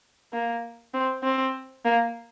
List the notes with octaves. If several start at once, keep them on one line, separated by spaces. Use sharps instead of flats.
A#3
C4
C4
A#3